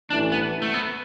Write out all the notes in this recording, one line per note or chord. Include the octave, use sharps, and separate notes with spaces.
A1 A2 E3 D4
B3
A3
B3